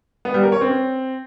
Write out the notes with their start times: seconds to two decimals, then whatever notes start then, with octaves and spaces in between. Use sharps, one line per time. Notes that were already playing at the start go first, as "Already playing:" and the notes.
0.25 B3
0.34 G3
0.43 A#4
0.52 C#5
0.61 C4